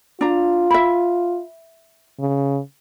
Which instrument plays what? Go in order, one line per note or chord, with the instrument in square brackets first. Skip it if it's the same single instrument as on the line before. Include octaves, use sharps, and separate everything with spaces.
[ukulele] D4 A#5 [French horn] F4
[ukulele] E5 B5
[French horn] C#3